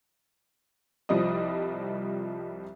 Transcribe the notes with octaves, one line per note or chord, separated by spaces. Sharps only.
C2 F3 G3 D#5 D#6